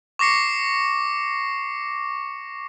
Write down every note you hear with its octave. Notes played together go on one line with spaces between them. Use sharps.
C#6 D6 A#6 C7 C#7